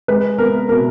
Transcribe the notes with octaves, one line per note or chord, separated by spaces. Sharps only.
G#3 B4
B3 A#4
B2 A#4